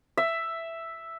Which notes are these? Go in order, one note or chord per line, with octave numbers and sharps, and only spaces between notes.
E5